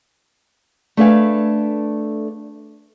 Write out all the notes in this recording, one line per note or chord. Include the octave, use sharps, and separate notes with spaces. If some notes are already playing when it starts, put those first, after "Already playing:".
A3 D4 A4 B4 F5 G#5